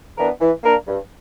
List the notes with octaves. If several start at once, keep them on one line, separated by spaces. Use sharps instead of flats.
E3 B3 D4 A#4
E3
A#3 D4 A#4
G2